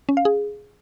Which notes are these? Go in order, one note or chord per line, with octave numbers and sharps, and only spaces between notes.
C#4
F5
G#4